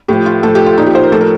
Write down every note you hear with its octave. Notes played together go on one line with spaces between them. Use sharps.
A2 F3 G4
F4
A2 F3 A4
G4
F4
A#2 F3 D#4
G4
C5
A#4
A2 F3 A4
A#4